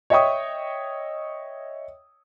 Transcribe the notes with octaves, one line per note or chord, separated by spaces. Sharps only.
C#5 D#5 E5 G5 C#6 D#6